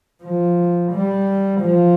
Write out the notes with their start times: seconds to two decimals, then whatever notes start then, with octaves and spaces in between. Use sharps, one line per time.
0.23 F3
0.92 G3
1.61 F3